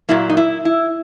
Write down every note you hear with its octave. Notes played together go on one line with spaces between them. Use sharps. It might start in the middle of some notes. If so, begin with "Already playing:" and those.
A#2 F#3 A#3 E4
D#4
E4
E4